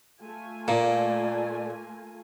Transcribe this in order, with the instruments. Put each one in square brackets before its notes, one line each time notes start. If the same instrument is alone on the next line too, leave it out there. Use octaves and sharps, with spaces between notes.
[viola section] A3 F4 G#5
[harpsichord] A#2 [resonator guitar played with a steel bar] A#3 [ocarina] D5